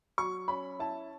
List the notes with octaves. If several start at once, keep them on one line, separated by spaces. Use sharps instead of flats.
F#3 C#6
C#4 B5
E4 A5